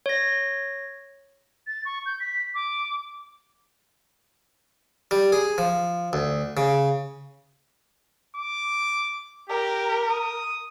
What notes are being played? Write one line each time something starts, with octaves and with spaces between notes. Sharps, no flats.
C#5 A#6
A6
C#6
G6
B6
D6
G3
G#4
F3
D2
C#3
D6
G4 A#4
D#6